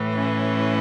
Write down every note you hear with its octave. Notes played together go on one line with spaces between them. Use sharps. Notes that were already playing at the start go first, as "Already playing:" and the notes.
Already playing: A2 E3
C#4